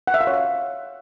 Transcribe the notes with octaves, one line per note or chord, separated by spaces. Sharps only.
F#5
E5
F5
C#5
F5